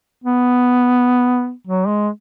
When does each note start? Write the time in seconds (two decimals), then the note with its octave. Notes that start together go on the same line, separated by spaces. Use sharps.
0.24 B3
1.68 F#3
1.87 G#3